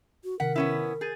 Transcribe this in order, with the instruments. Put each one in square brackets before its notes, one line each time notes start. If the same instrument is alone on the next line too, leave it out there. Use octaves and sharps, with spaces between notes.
[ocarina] F#4
[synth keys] C3 D#3 B6 [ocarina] A#4 [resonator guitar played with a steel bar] F#5
[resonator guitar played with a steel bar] B3 C#4 E4
[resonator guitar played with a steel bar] G#4 [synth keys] G6 A6 D#7